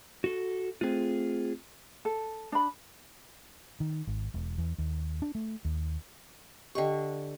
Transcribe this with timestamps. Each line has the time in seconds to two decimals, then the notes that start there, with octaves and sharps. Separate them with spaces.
0.24 F#4 A4
0.81 A3 C4 F4 G#4
2.05 A4
2.52 D4 B5
3.80 D#3
4.07 G#1
4.34 E1
4.58 E2
4.78 D#2
5.22 D4
5.35 A3
5.65 D#2
6.75 D3 G4 D#5 G5 C#6